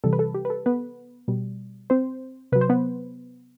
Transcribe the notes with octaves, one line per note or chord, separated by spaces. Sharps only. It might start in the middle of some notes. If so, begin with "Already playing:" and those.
C3 E3 G3 A4
B4
A4
G4
B4
A4
B3 B4
B2 G3
C4 C5
C3 F#3 B4
C5
B3 B4